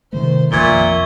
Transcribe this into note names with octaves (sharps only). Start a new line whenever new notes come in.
C3 D#3 A3 C5
A#1 F2 A#2 E5 C#6 G#6 G7